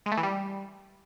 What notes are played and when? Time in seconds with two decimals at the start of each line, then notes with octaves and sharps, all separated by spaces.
0.06 G#3
0.12 A3
0.17 E3
0.23 G3